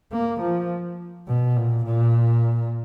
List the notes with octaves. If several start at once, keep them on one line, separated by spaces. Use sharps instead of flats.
A#3
F3
B2
A#2
A#2